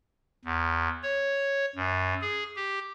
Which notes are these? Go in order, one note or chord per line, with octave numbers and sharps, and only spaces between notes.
E2
C#5
F#2
G#4
G4